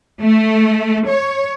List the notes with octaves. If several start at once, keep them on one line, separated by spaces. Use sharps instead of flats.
A3
C#5